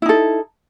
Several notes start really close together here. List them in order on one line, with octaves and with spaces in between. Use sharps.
E4 D#4 A4